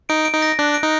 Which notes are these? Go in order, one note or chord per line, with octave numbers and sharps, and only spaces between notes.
D#4 D7
D7
D#4
A#6
D4 F#6
D7
D#4